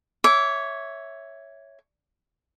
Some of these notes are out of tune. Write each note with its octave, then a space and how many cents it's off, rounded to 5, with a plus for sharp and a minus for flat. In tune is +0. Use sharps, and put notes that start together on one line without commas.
C#5 +0 E5 +0 D6 -25